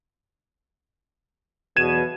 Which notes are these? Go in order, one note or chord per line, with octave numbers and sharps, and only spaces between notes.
B1 E2 B2 G#6 D#7 E7